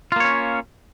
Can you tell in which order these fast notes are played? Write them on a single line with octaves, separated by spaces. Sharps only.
F4 A#3 C#5 C#4